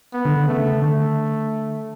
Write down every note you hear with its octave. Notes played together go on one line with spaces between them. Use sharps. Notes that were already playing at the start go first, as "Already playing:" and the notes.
B3
D3
D3
C#3 A3
D3 A3